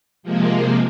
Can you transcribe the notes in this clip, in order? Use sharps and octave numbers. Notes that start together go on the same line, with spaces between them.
C3 F3 G#3 A#3